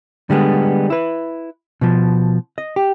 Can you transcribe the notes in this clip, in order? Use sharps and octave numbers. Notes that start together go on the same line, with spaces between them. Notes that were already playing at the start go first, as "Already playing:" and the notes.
D3 G3 G#3 B3
E4 B4
B2 F3
D#5
G4